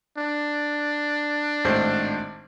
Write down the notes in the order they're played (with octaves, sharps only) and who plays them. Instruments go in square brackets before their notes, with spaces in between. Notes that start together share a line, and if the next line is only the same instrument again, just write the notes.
[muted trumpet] D4
[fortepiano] G#1 A2 C5